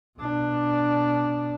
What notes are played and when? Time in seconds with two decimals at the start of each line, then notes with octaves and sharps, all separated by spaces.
0.19 B2 D4